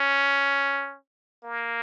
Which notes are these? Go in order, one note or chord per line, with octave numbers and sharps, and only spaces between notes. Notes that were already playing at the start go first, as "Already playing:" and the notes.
Already playing: C#4
A#3